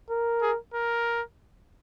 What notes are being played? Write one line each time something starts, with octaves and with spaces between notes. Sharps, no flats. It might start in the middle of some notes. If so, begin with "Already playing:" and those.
A#4
G#4
A#4